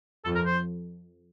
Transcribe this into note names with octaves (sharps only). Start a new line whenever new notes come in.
F2 A4
A#4
C5